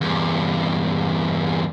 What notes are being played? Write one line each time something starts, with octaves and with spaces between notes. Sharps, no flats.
E2 G2